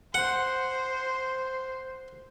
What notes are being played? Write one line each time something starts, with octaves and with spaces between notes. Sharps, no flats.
C5 F#5